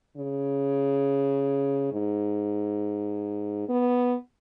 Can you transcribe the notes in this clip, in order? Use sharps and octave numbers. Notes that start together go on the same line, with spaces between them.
C#3
G#2
B3